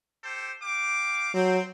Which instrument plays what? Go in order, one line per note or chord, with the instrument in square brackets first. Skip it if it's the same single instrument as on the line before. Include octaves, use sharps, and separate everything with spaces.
[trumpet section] G4 A4 C5
G4 F5 D6
[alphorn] F#3 [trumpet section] C4